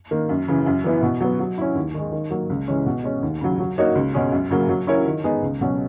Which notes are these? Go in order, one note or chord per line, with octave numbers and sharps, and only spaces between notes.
D#3 A#3
F#2
C#3 E3
F#2
E3 B3 E4
B2
F#3 B3
F#3
C#4 E4
D#2
D#3 G#3
D#3
F#3 A#3
C#2
C#3 E3 G#3 C#4
B2
G#3 C#4
D#2
C#3 F#3
F#3
A#3 D#4 F#4 C#5
C#2
B2 G#3 C#4 G#4
F#2
C#3 F#3 A#3
F#3
C#4 E4 A#4 C#5
D#3
G#3 B3 D#4 G#4
C#2
B2 F#3 C#4